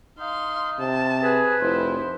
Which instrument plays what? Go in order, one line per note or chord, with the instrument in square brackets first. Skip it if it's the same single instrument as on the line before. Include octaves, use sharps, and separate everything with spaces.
[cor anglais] D#4 [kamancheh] F5 C6
[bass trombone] C3 [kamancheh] A5
[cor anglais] G#4 [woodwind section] B4
[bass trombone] F1 [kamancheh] E4 [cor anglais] C5